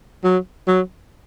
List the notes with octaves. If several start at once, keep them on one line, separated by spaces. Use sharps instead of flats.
F#3
F#3